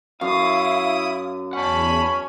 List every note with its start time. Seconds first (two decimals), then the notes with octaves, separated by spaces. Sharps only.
0.21 F#2 E4 F5 D#6
1.53 E2 C#4 F#5 A5 B5